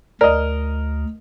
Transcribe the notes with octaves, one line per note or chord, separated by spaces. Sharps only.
D2 A#4 D5 D#5